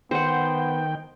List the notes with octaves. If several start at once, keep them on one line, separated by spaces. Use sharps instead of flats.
D#3 B3 C5 F#5 G5